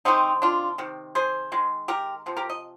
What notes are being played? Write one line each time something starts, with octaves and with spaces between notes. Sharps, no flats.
C3 D#3 G#3 C4 D#4
D4 F4
C3 D#3
G#4 C5
D#3 G#3
G4 A#4
C3 F3
G4 A#4
D#5